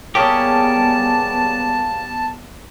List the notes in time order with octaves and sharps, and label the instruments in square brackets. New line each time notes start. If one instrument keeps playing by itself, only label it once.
[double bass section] G3 B3 [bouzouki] A#3 C#4 G#4 [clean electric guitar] G4 [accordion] A5